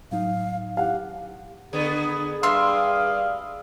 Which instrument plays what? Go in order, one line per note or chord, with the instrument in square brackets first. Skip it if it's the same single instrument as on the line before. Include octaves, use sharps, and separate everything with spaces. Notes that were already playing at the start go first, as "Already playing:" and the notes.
[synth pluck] A2 F#3 D#4 [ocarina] F5
[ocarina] G4 [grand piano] F5 F#5
[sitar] D3 B3 [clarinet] G#4
[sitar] G2 [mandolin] E5 C6 [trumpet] F5